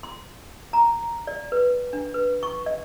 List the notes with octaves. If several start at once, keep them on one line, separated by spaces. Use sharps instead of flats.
C6
A#5
D5
B4
D4
B4
C#6
D#5